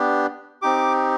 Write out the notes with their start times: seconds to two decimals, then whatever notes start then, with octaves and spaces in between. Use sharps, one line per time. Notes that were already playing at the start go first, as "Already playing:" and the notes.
Already playing: B3 D4 G4
0.62 C4 D#4 G4 D6